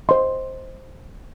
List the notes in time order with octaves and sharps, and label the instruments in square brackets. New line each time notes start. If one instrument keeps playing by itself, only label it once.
[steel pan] C5 D#5 C6